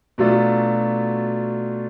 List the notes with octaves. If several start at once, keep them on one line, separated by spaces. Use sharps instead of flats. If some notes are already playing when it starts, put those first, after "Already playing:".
B2 F#3 A3 D4 F4